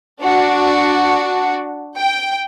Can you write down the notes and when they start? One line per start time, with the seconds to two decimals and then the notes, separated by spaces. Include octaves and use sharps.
0.23 D4 F#4
1.97 G5